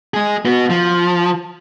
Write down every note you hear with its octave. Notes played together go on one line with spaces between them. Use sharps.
G#3 G#4
B3 F#4
F3